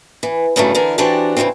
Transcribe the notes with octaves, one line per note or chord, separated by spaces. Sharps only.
E3
E2 G2 C#3 E3 F#3 A3
D3 E3 A#4
E3 C4 D4 F#4 G4 A5
C#3 E3 F3 G#3 C4